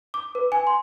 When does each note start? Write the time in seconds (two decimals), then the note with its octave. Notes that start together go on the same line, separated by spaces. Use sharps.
0.14 D6
0.35 B4
0.52 G#5
0.67 C6